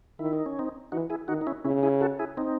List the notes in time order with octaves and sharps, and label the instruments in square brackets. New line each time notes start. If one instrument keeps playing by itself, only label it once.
[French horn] D#3 [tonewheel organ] E4
[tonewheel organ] D#4
C#4
C4 D#4
[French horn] E3 [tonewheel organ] D#4 F#4
[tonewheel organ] E4 G#4
[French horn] D#3 [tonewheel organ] D#4 F#4
[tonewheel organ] D#4
C#4 E4
[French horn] C#3 [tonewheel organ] C#4 E4
[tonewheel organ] E4 G#4
F#4 A4
E4 G#4
C4 D#4